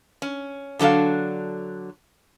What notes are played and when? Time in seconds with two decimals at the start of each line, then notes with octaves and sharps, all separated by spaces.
0.22 C#4
0.79 D3 F#3 D4 A4 F5